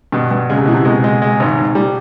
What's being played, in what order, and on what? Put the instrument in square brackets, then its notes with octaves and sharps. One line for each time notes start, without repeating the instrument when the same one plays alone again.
[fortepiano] G2 [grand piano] B2
[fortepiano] G2
[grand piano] C#3 [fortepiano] G#3
[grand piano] C3
[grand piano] B2 [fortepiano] E3
[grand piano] C3
[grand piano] B2 [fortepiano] G#3
[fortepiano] G#3
G#3
G#1
G#2
G3